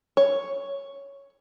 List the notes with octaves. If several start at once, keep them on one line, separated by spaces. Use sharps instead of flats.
C#5